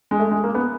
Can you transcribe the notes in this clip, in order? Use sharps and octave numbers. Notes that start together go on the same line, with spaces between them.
G#3
A3
G#3
A#3
B3